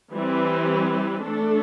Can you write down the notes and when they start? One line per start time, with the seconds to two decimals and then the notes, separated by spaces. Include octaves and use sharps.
0.11 E3 G3 C4 E4 B4
1.21 A3 D4 A4